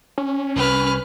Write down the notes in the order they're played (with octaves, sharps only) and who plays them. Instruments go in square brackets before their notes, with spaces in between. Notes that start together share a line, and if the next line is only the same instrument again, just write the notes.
[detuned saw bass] C#4
[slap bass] C2 G3 [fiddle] B4 F6